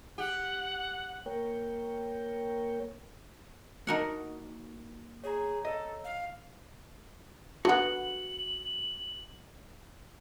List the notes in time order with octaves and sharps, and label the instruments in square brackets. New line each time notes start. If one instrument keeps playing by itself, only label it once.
[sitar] G4 [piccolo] F#5
[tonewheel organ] A#3 A#4 C#5 G5
[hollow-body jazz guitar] A#3 F#4 A5 [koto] D#4 A#4 F#5
[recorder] G#4 [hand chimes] C#5 A#5
[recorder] A4 [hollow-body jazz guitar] D#5
[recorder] F5
[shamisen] D3 B3 [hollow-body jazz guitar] F#4 F#5 [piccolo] F#7